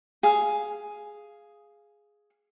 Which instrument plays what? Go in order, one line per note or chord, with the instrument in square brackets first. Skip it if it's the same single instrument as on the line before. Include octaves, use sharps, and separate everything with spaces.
[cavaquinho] G#4 F5